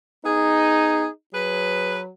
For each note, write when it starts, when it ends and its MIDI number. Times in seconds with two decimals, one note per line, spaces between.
0.25 1.06 59
0.25 1.07 63
0.25 1.06 68
1.33 2.09 54
1.33 1.99 68
1.33 1.99 71